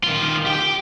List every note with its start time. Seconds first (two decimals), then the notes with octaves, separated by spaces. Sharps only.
0.04 D#3 F4
0.46 G4 G5